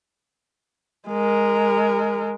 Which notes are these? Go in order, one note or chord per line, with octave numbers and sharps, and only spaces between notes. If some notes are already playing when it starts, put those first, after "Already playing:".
G#3 A#4